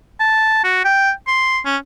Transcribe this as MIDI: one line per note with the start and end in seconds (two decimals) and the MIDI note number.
0.20 0.61 81
0.64 0.83 66
0.85 1.11 79
1.27 1.59 84
1.65 1.77 61